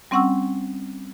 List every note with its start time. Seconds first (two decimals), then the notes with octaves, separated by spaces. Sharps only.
0.11 G3 C4 C#4 F#5 C#6 E6